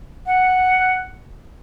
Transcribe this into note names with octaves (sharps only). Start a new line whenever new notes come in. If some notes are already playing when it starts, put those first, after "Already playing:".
F#5